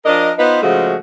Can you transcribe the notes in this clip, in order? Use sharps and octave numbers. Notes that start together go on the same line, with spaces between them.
F3 D4 A#4 D#5
B3 D#4 F4 B4 C5
C#3 F3 G#3 A3 F#4